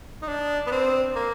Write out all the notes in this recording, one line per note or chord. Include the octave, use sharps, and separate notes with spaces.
D#4
D4
B3
C4
A#3